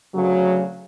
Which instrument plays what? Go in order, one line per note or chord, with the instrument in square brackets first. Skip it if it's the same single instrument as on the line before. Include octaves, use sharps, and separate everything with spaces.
[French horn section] D2 C#3 F#3